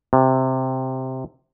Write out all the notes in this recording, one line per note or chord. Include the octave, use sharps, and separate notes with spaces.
C3